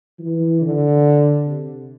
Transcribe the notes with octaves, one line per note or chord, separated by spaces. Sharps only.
E3
D3
C3